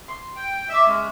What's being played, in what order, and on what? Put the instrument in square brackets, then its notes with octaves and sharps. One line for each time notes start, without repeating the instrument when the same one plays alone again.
[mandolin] C6
[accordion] G5
[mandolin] D#5 D6 [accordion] E5 E6
[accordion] G#3 [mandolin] C#4 E5